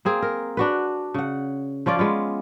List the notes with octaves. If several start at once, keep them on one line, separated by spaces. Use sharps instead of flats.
A#3 C4 G#4
A#4
D4 F#4 B4
C#3 F#5
F3 C#4 F4 D5
G#3 B3 F4